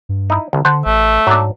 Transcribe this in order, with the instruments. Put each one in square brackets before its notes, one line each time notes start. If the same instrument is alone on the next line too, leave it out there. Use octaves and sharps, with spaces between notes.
[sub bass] G2
[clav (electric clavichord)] D#4 E4
[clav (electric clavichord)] C2 [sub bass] D3
[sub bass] D3 [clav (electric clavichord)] C5 F#5 A5
[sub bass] A1 [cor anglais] A3
[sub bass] G#2 [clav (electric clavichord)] F#3 D4